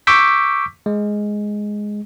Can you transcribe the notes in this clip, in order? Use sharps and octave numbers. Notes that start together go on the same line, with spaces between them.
C#6 D6 E6 G6 B6
G#3